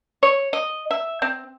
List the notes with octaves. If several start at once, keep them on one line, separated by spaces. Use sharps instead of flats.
C#5
D#5
E5
C4